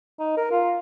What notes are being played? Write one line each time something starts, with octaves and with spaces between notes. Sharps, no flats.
D#4
A#4
F4